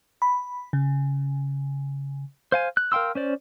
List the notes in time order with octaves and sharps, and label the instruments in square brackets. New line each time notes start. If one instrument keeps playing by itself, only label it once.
[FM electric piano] B5
C#3
[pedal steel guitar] C5 F5 G#5
F#6
A#4 F5 G5 C6 E6
C#4 C5 D5